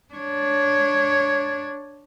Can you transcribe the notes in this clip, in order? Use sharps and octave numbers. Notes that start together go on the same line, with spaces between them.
D4 C#5